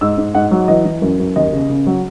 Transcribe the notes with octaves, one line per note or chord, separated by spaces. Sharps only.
G#2 E6
G#2
G#2 F#5
F#3
E3 D#5
E3
F#2
F#2
D#2 D#5
C#3
C#3
F#3